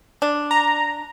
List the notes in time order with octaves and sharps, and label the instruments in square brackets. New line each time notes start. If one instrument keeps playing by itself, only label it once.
[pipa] D4
[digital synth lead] A#5